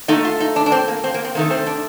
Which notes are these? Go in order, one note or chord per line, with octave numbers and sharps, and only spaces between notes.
A#2 A3 D#4
F4
D#4
D4
D4
C4
A#3
C4
A#3
C4
C3 D#3 A3 A#3
C4
D4